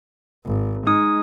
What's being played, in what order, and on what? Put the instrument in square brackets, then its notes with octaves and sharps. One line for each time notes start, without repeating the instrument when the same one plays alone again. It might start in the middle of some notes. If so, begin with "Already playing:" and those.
[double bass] G#1
[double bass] G#3 [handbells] D#4 D#6